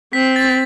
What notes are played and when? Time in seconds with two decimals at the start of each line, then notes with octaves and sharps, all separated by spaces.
0.13 C4 B6
0.36 A6